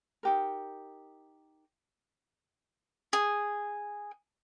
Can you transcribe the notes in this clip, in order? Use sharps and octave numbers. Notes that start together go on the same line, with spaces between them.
D#4 G4 A#4
G#4